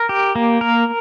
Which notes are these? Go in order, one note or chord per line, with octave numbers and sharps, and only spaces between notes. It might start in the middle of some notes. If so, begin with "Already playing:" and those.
Already playing: A#4
G4
A#3
A#4